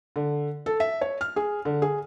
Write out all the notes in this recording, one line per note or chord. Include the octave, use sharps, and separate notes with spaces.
D3
A4
E5
C#5
F6
G#4
D3
G#4